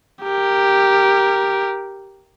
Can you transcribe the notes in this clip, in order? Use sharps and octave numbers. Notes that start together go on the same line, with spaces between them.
G4 A#4